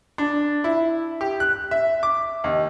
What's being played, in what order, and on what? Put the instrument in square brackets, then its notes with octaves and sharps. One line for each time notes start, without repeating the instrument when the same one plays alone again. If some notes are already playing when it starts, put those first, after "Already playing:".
[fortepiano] D4
E4
G4
F#6
E5
D6
D#2